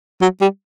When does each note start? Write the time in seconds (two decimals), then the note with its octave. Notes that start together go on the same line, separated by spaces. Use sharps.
0.21 F#3
0.41 G3